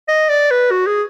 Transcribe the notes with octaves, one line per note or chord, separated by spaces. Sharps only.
D#5
D5
B4
F#4
G#4